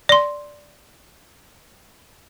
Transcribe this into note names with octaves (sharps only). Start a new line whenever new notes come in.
D5 C6